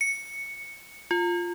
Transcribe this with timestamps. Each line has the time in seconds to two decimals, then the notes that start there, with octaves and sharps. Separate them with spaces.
0.01 C#7
1.11 F4